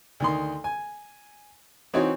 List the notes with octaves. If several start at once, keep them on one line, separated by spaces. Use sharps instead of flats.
D2 D#3 C6
G#5
E3 C4 D#4 F#4 C#5